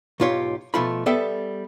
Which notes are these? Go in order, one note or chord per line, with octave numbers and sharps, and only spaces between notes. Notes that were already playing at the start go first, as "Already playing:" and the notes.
B1 G#2 F4 G4 C#5
B2 F3 A3 F4 B5
G3 B3 A4 E5 G5